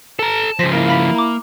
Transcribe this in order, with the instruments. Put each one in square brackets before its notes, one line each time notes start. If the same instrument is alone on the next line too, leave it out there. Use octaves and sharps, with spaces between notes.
[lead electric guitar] A4 A#5 [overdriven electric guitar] A5
[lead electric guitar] C#3 F3 [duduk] C5 [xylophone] A#6 B6
[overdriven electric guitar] A#3 [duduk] E4 [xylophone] A#4
[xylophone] F5 B5 B6
A#5 D6